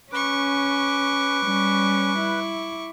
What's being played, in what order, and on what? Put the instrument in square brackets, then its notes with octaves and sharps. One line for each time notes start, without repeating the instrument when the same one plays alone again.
[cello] C#4 [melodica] B4 [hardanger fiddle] C#6 D6
[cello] G3 C#4
E4